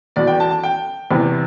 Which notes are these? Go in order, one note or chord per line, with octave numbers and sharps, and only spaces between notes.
E2 B2 D5
G5
A5
A5
G5
E2 C3 E3